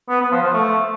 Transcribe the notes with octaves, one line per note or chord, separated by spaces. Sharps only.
B3
B3
F3
F3
A3